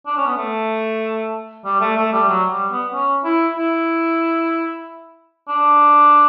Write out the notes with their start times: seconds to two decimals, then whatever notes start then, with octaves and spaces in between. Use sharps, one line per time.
0.07 D4
0.17 C#4
0.27 B3
0.37 A3
1.65 G3
1.81 A3
1.97 A3
2.13 G3
2.29 F#3
2.51 G3
2.72 B3
2.93 C#4
3.25 E4
3.57 E4
5.49 D4